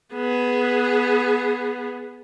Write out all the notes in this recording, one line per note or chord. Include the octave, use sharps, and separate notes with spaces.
B3 G#4